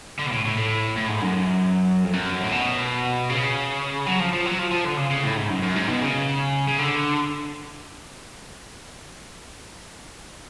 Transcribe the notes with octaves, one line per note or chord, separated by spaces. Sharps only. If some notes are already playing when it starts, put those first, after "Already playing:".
D3
B2
A2
A2
A2
A2
G#2
F#2
F2
F#2
A2
B2
C#3
F#3
F3
F3
F#3
F3
F3
D3
C#3
C#3
A2
G#2
F#2
F#2
G#2
B2
C#3
C#3
D3